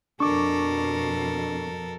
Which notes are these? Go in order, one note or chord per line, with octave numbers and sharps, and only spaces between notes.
F2 B2 D4 A4 A#4 C#6 D6